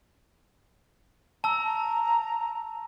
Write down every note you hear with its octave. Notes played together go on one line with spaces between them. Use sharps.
A5 A#5 E6